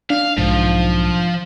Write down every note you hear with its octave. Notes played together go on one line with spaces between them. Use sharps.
D4 F5
B1 G#2 F3